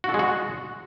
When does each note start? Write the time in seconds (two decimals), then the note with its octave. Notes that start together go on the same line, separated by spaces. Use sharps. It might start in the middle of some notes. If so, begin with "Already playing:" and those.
0.04 F#4
0.09 A4
0.14 G#3
0.19 F#4